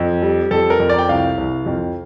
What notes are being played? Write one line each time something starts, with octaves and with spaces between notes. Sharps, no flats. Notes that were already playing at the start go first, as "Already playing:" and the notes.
Already playing: F2
G3
F2 A4
A#4
F2
D5
G5
C2 F5
C2
F2